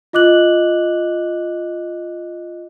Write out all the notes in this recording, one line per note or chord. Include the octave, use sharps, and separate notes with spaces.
F4 D#5 D6 F#6 F#7